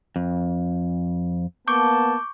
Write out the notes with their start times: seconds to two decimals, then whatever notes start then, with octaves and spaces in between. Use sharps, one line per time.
0.16 F2
1.68 A#3 B3 A5 C#6 D6 G6